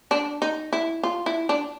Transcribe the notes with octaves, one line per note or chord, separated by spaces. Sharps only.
D4
D#4
E4
F4
E4
D4